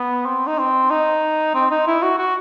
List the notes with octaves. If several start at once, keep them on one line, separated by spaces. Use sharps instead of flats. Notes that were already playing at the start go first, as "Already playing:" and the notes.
Already playing: B3
C4
D#4
C4
D#4
C4
D#4
E4
F#4
F#4